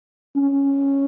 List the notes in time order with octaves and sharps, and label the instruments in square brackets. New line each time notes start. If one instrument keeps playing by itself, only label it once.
[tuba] C#4